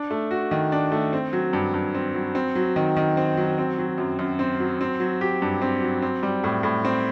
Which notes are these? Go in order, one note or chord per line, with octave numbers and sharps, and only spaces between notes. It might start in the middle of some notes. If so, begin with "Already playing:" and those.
Already playing: D4
A3
F#4
D#3
D4
A3
C4
F#3
G2
G2
C4
F#3
C4
F#3
D#3
D#3
C4
F#3
C4
F#3
F#2
F#2
C4
F#3
C4
F#3
G4
G2
C4
F#3
C4
G3
A2
A2
C4